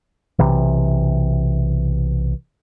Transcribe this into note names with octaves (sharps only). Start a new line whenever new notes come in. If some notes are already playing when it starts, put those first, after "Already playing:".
B1 C3 E3